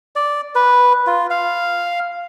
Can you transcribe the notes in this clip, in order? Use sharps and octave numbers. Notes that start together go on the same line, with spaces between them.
D5
B4
F4
F5